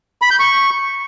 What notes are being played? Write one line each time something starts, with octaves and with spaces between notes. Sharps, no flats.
B5
G6
C#6